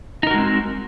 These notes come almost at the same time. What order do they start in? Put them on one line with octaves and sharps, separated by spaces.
D#4 A#4 F#4 G#3 C4